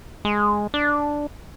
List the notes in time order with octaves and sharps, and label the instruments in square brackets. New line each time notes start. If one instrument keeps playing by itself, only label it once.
[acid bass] G#3
D4